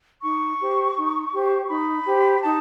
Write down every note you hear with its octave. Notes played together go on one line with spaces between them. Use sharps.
D#4 C#6
G4 C5
D#4
G4
C5
D#4 B5
G4 C5
D#4 A5